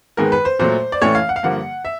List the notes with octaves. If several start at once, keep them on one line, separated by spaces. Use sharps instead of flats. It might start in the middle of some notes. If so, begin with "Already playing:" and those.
G#2 D#3 G#3 B3 A#4
B4
C5
A#2 F#3 A3 C5
D5
A2 E3 A3 C#4 C#5
F5
F#5
F5
G2 D3 F3 A#3 F#5
E5